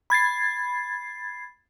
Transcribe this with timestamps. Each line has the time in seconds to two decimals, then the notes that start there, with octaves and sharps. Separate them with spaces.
0.10 B5 G#6 A6 C7